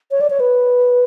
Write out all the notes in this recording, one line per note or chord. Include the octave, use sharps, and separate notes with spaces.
C#5
D5
C#5
B4